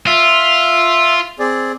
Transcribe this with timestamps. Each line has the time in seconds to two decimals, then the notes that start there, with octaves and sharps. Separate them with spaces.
0.07 F4 E5
1.39 C4 G#4 D5